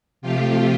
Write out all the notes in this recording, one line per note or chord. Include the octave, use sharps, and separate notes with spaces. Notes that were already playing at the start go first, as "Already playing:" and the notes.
C3 F3 A3 F4 G4